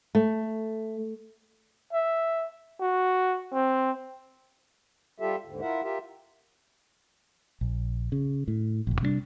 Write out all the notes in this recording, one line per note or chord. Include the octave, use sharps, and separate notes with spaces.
A3
E5
F#4
C4
G3 F4 G4 A4 E5
D#2 G#2 D3
E4 F4 A#4 E5 F#5
F4 G4 A#4 E5
A#1
C#3
A2
F1 A#1
C3 G3 B3 D4